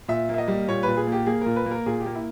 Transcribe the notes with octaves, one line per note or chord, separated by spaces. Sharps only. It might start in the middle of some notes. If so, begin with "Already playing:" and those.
A#2 E5
A#3 E5
D#5
G3
A#2 C#5
A#2 B4
G#4
A#3 G4
A#3 G#4
A#2 A#4
B4
A#3
A#4
A#2 G#4
G4
A#3
E4